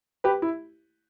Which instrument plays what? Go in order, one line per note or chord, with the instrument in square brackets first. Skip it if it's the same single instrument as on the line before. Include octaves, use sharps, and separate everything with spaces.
[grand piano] G4 B4
E4